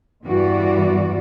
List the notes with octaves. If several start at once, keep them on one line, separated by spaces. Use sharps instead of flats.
E2 G2 E3 F#4 D5